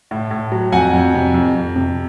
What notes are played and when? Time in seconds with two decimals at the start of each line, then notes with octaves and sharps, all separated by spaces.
0.11 A2
0.31 A2
0.52 F#3
0.72 F2 F#5 G#5
0.93 F2
1.14 C3
1.34 F2
1.55 F2
1.76 C3